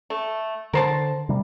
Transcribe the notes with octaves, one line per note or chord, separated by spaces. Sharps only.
A3
D3 A#4 C5 A5
C3 G3